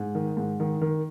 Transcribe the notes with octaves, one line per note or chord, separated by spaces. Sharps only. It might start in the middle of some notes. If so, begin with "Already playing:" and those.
Already playing: G#2
D#3
G#2
D#3
D#3